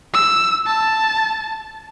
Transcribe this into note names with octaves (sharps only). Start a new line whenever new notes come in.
E6
A5